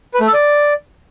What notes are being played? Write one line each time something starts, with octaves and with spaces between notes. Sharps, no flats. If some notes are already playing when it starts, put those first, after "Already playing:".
B4
A3
A4
D5